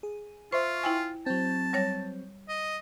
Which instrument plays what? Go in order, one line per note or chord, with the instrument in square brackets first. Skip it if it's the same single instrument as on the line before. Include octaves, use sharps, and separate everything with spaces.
[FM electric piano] G#4
[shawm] F4 [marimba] C5 [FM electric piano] E5 C6 C#6
[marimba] E4 G5 G#5
[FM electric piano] F#3 C4 [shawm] A5
[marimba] G3 C#5 A#6
[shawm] D#5